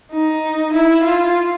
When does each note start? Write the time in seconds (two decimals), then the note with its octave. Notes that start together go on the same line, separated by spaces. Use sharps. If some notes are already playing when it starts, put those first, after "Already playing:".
0.12 D#4
0.73 E4
1.04 F4